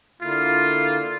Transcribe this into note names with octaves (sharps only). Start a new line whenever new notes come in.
D3 A#3 E4 F4